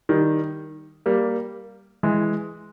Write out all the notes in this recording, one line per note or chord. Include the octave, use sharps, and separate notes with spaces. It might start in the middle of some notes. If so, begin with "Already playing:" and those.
D#3 G3
G3 A#3
E3 G#3